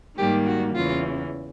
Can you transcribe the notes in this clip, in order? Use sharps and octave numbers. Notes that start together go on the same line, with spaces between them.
G#2 D#3 G3 A#3 G4
F#4
E2 C#3 E3 F4